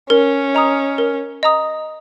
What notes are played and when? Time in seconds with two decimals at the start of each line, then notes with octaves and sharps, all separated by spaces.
0.10 C#4 A#4
0.55 D#5 A#5 D#6
0.98 A#4
1.43 D#5 A#5 D#6